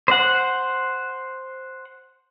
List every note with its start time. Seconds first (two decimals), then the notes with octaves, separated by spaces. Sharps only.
0.08 C5 F#5